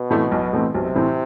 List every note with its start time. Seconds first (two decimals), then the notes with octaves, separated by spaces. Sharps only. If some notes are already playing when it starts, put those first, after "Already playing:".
Already playing: B2
0.10 A2 E3 A3 C4
0.32 B1
0.53 A2 E3 A3 C4
0.74 B1 C3
0.95 A2 E3 A3 C4